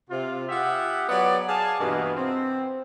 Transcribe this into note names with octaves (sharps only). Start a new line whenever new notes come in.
C3 F4
F4 G4 G#4 E5 F#5
F#3 B3 G#4 D5
G#4 D5 F5 G#5 A5
G2 B2 E3 A#3 B3 F4
C4